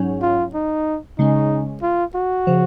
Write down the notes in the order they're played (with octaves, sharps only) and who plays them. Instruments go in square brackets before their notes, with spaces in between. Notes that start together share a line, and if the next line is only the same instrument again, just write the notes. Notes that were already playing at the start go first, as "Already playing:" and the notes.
Already playing: [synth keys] G#2 F#3 C#4
[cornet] F4
D#4
[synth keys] C#3 G#3 C#4 [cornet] D#4
[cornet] F4
F#4
[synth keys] C#3 F3